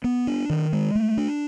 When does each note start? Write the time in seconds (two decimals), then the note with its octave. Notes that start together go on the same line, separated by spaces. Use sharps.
0.04 B3
0.27 D4
0.50 D#3
0.73 G#3
0.95 A3
1.17 D4